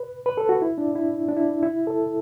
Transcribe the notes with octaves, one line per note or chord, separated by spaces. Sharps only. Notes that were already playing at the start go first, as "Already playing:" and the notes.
Already playing: B4
B4
A4
F#4
E4
D4
E4
D4
E4
E4
A4